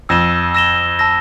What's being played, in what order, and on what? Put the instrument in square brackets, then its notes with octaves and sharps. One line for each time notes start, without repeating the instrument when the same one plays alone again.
[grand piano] F2 [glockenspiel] E6 A#6 E7 G7
[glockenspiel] E6 A#6 E7 G7
A5 E6 A#6